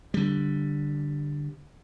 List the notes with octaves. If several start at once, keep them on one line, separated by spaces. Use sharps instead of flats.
D3 G3